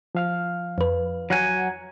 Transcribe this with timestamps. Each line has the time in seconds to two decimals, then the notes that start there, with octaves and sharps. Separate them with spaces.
0.15 F3 F5 F6
0.78 F2 B4
1.30 F#3 F#5 G#5